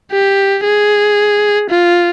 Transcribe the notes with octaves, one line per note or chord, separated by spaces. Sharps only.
G4
G#4
F4